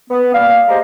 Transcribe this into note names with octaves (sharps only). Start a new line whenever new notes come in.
B3
G3 A#3 F5
G#3 G4 C5 D#5 A#5